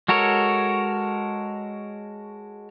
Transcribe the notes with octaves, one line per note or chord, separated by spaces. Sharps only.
G#3 F#4 A4 A#4 C#5